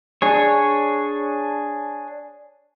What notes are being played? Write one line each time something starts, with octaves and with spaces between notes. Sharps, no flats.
D4 G#4 C#5